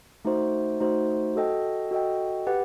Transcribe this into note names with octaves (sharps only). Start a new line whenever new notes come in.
A3 D#4 F#4 C5
A3 D#4 F#4 C5
F#4 A4 D#5 G5
F#4 A4 D#5 G5
G4 B4 F#5